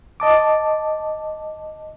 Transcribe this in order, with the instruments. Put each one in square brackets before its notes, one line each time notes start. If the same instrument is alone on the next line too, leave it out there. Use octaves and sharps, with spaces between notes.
[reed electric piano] D#5 A5 D6